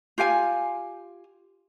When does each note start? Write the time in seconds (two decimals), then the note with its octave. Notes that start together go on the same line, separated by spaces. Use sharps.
0.18 F4 G4 F5 G#5